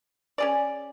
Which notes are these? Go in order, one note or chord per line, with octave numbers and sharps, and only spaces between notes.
C#4 G#4 D5